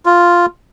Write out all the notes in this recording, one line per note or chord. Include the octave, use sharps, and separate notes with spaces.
F4